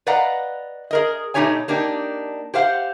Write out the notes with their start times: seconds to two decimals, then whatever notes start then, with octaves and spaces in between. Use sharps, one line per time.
0.07 B4 D5 D#5 F5 F#5 A#5
0.91 G#4 A#4 D#5
1.34 B2 A3 D#4 G4 C#5 G#5
1.68 A#3 D4 D#4 G4
2.54 G4 C5 F5 F#5